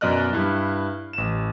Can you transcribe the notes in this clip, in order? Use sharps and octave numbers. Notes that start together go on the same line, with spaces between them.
F#2 B2 D5 D#5 F6 F#6
G2 E4
A1 E7